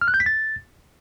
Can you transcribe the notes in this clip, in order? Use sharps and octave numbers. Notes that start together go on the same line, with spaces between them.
F6
F#6
G6
B6
A6